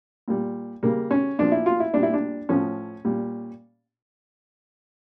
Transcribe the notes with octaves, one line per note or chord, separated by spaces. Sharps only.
A#2 G3
C#3 G3 A#3
C#4
A#2 F3 D4
E4
F4
E4
A#2 G3 D4
E4
D4
A2 F3 C#4
A#2 G3